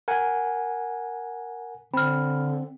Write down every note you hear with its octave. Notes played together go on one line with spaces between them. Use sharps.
A#4 F#5 G#5
D3 C4 B5 F6